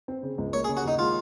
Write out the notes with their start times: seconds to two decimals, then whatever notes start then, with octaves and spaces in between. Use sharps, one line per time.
0.08 C4
0.23 C#3
0.38 C#2
0.53 A#3 C#5
0.64 G#4
0.69 C#3
0.77 F#4
0.84 D#2 D#4
0.99 G#3 F4